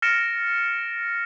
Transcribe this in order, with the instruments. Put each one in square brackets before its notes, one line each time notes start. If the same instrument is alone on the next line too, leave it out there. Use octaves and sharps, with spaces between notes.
[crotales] F6 A6 A#6 C#7 D7 E7